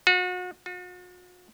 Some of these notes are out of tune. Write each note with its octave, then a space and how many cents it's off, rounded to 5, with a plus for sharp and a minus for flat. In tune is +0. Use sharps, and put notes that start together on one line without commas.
F#4 -35
F#4 -45